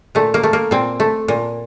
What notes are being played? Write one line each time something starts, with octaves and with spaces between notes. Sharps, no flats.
A#2 A3
A#3
A3
A#3
A#2 C4
A3
A#2